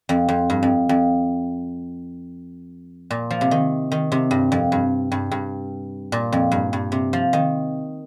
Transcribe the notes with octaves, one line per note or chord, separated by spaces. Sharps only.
F2
F2
G2
F2
F2
A#2
F3
C3
D#3
D#3
C3
G2
F2
G2
G2
G2
A#2
F2
G2
G2
C3
F3
D#3